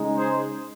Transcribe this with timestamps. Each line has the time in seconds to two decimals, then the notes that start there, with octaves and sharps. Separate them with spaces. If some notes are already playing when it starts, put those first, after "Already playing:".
Already playing: C#3 G#3 D#4
0.16 G#4 C5